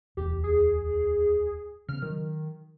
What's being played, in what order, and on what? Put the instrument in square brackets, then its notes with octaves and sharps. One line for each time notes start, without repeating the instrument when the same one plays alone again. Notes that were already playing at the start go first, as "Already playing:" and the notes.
[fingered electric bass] D1 E2 [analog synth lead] G4
[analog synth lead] G#4
[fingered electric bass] C#3 B3 [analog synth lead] F6
[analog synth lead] D#3 [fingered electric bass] F#3